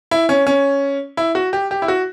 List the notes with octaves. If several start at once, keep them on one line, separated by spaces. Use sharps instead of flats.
E4
C#4
C#4
E4
F#4
G4
G4
E4
F#4